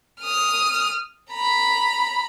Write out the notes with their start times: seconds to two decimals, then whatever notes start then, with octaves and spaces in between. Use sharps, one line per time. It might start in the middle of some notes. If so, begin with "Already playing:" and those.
0.21 D#6 F6
1.33 A#5 B5